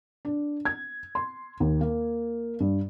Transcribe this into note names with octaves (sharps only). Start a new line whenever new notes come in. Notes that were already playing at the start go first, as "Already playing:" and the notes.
D4
G#6
C6
D#2
A#3
G2